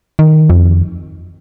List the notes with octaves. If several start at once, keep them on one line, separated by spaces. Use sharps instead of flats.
D#3
F2